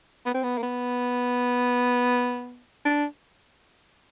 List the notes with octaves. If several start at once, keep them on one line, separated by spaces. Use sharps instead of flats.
B3
C4
B3
A#3
B3
D4